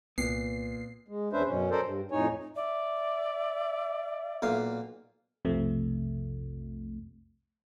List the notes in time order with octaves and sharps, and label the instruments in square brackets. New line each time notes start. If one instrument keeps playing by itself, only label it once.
[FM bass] C2 [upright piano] A#2 [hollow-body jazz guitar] B3 [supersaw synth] C7
[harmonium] G#3
E2 C#4 D4 B4 C5 E5
F#2 B2 C#4
C#4 A4 A#4 C5 D5
G2
F2 A2 D#4 C#5 G#5
[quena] D5 [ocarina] E5
[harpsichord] B1 A#2 F5
[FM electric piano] B1 F2 C3 F3 A3